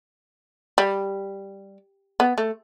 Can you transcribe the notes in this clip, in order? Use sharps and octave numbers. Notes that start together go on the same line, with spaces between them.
G3
B3
A3